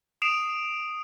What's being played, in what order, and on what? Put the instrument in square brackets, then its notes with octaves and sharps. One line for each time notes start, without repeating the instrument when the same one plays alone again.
[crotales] D#6 C7 D7 E7 F7